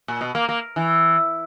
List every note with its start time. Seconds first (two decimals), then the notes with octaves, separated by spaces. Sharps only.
0.08 A#2
0.21 B2
0.35 A#3
0.49 A#3
0.76 E3